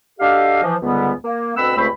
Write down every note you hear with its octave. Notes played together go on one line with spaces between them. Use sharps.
D4 F#4 G4 A4 D#5 F5
E3 F3
C#2 G#2 D3 G3 B3
A#3
D2 B2 C4 F#5 B5 E6
C#2 G2 A3 C4 C5 B5